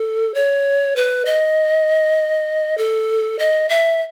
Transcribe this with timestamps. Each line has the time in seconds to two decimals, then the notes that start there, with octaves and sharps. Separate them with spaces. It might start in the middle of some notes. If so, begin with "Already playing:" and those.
Already playing: A4
0.34 C#5
0.96 B4
1.25 D#5
2.78 A4
3.39 D#5
3.69 E5